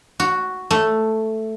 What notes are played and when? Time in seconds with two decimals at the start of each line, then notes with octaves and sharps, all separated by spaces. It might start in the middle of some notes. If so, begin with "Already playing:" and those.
0.20 F#4
0.71 A3